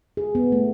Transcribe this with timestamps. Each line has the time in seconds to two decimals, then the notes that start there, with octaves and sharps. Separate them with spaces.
0.17 G#4
0.35 B3
0.52 A3